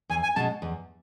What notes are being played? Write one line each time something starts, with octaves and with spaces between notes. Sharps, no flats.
E2 G#5
G#5
B2 G#3 C#4 A5
E2